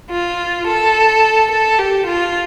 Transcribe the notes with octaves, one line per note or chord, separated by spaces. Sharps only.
F4
A4
A4
G4
F4